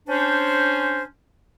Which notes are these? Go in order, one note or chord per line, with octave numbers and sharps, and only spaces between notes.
C#4 D4 C5